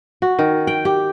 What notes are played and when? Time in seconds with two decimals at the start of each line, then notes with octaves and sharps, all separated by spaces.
0.22 F#4
0.39 D#3
0.67 G5
0.85 G4